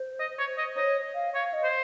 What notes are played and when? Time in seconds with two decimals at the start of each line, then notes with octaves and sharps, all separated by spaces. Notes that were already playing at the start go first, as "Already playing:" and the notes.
Already playing: C5
0.20 D#5
0.39 C#5
0.58 D#5
0.77 C#5 D#5
1.15 F5
1.34 C#5 F5
1.53 D#5
1.63 C5